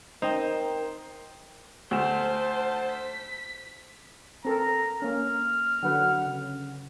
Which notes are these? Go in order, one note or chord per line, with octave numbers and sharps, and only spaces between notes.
D#4 A#4 C5 G5
D2 C5 A5 E7
B6
C4 A4 A#4 A#5
A#3 C#4 F6
D3 F#3 B4 F#5
C#3